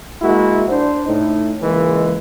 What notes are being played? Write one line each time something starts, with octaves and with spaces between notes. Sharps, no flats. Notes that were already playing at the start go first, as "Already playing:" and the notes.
G#3 A#3 E4 F#4
D4 C5
A2 D#4
C#2 E3 G#3 A#3